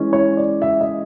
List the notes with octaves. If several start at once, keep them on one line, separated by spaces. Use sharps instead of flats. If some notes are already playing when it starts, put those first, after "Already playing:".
Already playing: E3 G#3 C#4
C#5
D5
E5
D#5